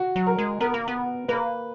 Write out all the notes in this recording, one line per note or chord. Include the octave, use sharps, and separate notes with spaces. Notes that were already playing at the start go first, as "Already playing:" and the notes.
Already playing: F#4
F#3
A#4
G#3
B3 A#4
A#3
B3
A#3 B4